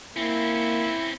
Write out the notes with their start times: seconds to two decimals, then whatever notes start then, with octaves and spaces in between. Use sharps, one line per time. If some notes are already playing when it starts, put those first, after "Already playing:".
0.17 A#3 C4 C#4 E4